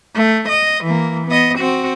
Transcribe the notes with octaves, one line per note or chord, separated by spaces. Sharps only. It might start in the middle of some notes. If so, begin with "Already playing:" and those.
A3
D#5
E3 A#3
B3 D#5
C4 F#4